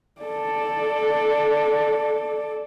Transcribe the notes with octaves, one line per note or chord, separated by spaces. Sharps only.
A4 D5